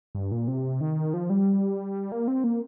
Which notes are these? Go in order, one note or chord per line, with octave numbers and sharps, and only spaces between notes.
G2
A#2
C3
D#3
F3
G3
A#3
C4
A#3